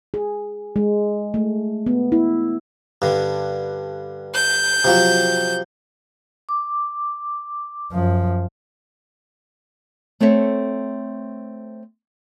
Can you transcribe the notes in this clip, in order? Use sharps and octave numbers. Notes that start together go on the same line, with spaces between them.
G#4
G#3
A3
B3
E4
G2 D3
G6
C3 F3 F#3
D6
F#2 F3
A3 C4 A4 C#5 E5